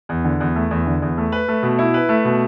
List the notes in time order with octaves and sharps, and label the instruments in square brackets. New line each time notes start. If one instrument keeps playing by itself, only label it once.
[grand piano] E2
D3
E2
A3
E2
D3
E2
A3
B4
A3
B2
E4
B4
A3
B2